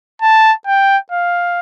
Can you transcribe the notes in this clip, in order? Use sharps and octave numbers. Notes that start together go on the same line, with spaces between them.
A5
G5
F5